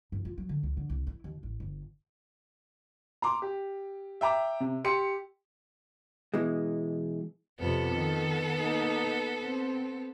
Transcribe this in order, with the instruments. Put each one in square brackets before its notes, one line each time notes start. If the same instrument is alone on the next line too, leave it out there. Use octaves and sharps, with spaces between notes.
[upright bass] G2
F4
F#3
D3
C#2
D3
C2
E4
D#2
A1
G1
[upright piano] A#5 C6 D6
G4
E5 G5 A#5 D6
C3
G4 C6 C#7
[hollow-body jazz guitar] B2 E3 G#3
[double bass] F2 C3 [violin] B3 A4
[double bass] D#3
A#3 D#4
C4